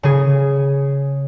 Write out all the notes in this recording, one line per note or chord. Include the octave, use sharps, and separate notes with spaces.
C#3 G#4